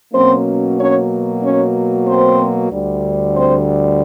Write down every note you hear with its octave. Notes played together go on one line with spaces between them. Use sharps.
B2 F#3 A#3 C4 C#4 C5
C#4 C#5
C#4 C#5
C4 C5
D2 D3 G3
C4 C5